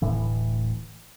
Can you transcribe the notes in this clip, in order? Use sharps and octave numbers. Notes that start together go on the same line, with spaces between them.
D1 A2 E3